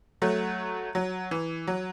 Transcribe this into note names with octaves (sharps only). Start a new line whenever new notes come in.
F#3 A3
F#3
E3
F#3